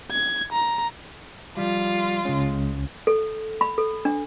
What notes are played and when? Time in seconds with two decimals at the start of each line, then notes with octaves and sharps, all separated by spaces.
0.11 G#6
0.53 A#5
1.57 F3 G3 F4
2.25 C#2 G#3 C#4
3.07 A4
3.61 B5
3.78 A4
4.05 D4